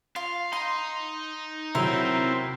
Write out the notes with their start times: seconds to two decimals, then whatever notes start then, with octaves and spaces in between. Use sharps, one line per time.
0.16 F4 F5
0.53 D#4 C6
1.75 C3 F#3 C4 E4 A#4